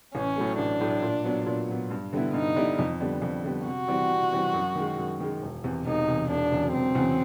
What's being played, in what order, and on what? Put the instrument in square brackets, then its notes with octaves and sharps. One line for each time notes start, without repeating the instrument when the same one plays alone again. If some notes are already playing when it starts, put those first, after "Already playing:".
[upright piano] A1 [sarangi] C#4
[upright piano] A2 F#3 A3
[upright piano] A1 [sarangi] D4
[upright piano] A2 F#3 A3
A#2
F#3 B3
A#2
F#3 B3
G2
D3 G3 B3 E4
[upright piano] G2 [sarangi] D#4
[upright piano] D3 G3 B3 E4
F2
D3 G3 B3
F2
D3 G3 B3
[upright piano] C3 [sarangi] F#4
[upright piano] E3 G3 C4
C3
E3 G3 C4
F#2
D#3 G#3
F#2
D#3 G#3
E1
E2 C3
[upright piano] E1 [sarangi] D#4
[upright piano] E2 C3
[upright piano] E1 [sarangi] D4
[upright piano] E2 C#3 F#3
[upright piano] E1 [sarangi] C4
[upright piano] E2 C#3 F#3